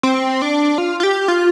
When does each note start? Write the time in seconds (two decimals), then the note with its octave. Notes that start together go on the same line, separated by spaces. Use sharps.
0.03 C4
0.42 D4
0.78 F4
1.00 F4
1.03 G4
1.28 F4